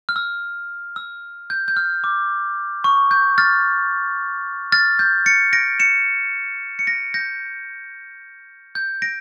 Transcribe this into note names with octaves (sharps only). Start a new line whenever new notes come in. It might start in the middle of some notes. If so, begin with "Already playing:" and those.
F6
E6
E6
G6
G6
F6
D6
C#6
G6
F6 A6
F6 A6
G6
A6 C#7
A#6 D7
C#7 E7
C#7
A#6 D7
G6 A#6
G6
A#6 D7